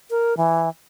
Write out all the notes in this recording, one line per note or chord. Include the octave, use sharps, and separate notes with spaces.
A#4
E3